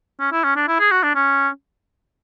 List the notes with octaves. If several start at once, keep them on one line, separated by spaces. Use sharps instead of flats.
C#4
E4
C#4
D4
E4
G#4
F#4
D4
C#4